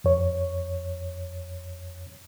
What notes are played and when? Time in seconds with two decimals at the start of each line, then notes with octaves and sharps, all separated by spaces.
0.04 F2 C#5